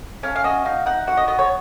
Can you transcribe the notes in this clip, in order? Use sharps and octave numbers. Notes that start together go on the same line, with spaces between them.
C#4 F5
F5
F#4 D#5
D#4 F5
D#4 F#5
F#4 F#5
D#5
B3 D#5
C#5